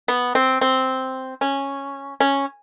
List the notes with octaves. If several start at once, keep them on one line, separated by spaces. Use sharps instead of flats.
B3
C4
C4
C#4
C#4